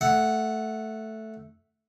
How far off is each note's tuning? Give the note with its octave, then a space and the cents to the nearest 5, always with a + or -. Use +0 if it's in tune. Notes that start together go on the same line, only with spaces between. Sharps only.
A3 +0 F#5 +0